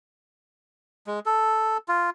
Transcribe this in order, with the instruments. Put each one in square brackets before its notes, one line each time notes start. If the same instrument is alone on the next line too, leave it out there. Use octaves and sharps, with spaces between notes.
[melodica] G#3
A4
F4